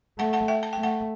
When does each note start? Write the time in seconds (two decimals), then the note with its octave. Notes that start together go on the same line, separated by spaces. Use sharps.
0.19 A3 F#5 A5
0.33 F#5 A5
0.48 E5 G5
0.63 A5
0.73 G5
0.78 A3
0.83 F#5 A5